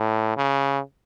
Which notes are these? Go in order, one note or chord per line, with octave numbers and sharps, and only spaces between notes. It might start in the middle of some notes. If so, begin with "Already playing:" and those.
Already playing: A2
C#3